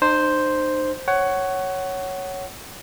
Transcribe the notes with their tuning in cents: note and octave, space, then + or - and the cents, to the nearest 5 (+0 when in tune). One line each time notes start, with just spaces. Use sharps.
D#4 -40 C5 +0
C#5 +0 F#5 +20